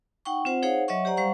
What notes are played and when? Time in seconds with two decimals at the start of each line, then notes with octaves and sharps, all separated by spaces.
0.25 D#4 F#5 G5 C#6
0.45 C4 F4 C5 F#5
0.63 D#4 G#4 C5 C#5 F5 F#5
0.88 F#3 C#5 D#5 E5 F#5 C#6
1.05 G4 C5 D5 F#5 A#5
1.17 G3 C5 F5 F#5 C#6